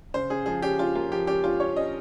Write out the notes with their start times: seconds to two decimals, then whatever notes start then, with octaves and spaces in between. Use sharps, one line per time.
0.14 C#3 C5
0.30 C#3 G#4
0.46 F3 G#4
0.62 C#4 G4
0.79 C#4 F4
0.95 A#3 F4
1.12 F3 G4
1.27 C#4 G4
1.44 C#4 F4
1.60 C#4 C#5
1.76 C#4 D#5